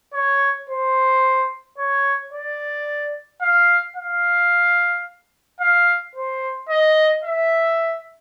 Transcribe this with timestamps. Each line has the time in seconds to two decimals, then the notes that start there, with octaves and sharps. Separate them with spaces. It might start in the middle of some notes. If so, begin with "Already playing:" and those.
0.14 C#5
0.69 C5
1.78 C#5
2.33 D5
3.42 F5
3.96 F5
5.60 F5
6.15 C5
6.69 D#5
7.24 E5